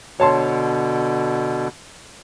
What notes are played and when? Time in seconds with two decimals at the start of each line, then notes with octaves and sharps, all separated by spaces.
0.20 B2 D3 C#5 A5 C6